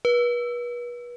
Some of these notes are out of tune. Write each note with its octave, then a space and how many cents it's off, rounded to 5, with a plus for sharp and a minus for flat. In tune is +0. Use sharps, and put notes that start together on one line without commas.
B4 -35